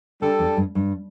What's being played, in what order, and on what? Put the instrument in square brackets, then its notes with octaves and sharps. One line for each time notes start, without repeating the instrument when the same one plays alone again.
[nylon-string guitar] D3 [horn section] G3 D4 A4
[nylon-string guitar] E2
G2
G2